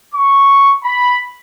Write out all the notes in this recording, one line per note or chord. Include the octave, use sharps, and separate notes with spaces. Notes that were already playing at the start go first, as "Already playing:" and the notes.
C#6
B5